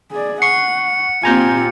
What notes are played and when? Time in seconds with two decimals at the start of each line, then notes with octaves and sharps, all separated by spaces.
0.12 G#4 D5
0.42 F#5 C#6 C7 C#7
1.23 A#2 C4 F4 G4 G#5 A#5 G6